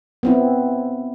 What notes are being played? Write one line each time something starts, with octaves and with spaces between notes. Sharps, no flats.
B3 C4 E4